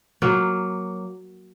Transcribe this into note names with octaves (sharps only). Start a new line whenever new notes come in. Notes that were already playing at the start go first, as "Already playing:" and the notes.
F#3 A#3